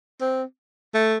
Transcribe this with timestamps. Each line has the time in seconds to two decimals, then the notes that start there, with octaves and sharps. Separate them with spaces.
0.21 C4
0.94 A3